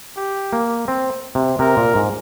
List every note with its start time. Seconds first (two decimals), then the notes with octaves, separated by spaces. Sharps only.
0.17 G4
0.53 A#3
0.88 C4
1.35 C3
1.59 C3 A#4
1.77 A#2
1.95 G#2